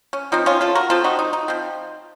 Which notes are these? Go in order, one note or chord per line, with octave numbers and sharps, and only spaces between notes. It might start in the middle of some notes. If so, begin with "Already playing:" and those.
C#4
F3 C4 D#4
C#4 F4
F4 A4
F#4 A#4
F3 C4 F4 A4
D#4 F#4
D#4
D#4
F3 C4